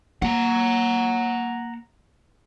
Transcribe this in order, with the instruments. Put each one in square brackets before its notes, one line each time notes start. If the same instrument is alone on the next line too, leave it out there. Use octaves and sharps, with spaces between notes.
[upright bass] A#3 [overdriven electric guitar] F#5 A#5